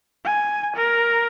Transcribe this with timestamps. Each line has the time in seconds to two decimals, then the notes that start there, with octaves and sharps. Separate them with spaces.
0.25 G#5
0.76 A#4